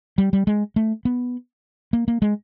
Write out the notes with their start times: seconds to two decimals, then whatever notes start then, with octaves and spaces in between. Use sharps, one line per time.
0.18 G3
0.33 G3
0.47 G#3
0.76 A3
1.05 B3
1.93 A#3
2.08 A#3
2.22 G#3